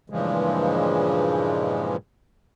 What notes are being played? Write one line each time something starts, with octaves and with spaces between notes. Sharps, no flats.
G2 A#2 C#3 E3 F3 G#3